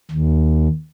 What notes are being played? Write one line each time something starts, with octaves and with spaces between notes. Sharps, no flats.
D#2